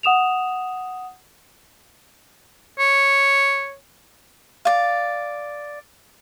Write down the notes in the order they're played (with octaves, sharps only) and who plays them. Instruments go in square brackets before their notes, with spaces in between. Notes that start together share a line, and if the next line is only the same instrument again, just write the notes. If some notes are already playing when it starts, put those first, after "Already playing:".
[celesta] F#5 D#6 E7 F7
[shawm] C#5
[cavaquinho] D5 F5